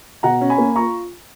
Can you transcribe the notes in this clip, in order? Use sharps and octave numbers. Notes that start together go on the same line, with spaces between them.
B2 F#5 A#5
C#4
G#5 B5
A#3
F4 A#5 C#6